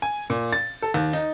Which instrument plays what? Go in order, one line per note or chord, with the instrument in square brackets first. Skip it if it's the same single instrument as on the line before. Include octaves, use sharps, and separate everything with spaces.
[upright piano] G#5
A#2
A6
A4
D#2
D#4